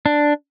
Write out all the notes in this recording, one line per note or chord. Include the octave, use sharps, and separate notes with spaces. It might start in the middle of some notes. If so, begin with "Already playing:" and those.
D4